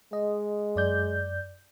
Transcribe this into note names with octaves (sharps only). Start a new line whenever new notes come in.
G#3 D#5
F#2 D5 G6